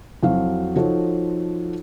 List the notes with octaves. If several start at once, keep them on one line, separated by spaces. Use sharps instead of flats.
F2 F#3 E4 F#4 F5
F3 D#4 F4 F#4 A4 C#5